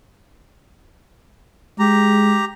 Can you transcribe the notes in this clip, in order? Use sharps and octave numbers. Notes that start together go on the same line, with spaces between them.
G#3 G4 A#5